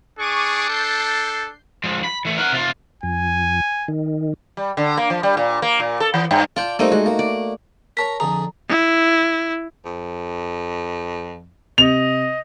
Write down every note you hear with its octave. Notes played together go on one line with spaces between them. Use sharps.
D4 G#4 C#6 D6 D#7
A4 G6 C7
F3 G#3
B5
E3 A3
A#4 F#5
C3 F4
F2 G#5
D#3
G3
D3
A#3
F3
G3
A#2
A#3
A#2
A4
E3
G2
F4 D5 G5 A5
G3 A3 A#3 C4 D#4
G#3 F#4
A#3
D5
A#4 C#5 A5 A#5 B6
F2 D3 G#4 A#5
E4
F2
C3 D#5 F7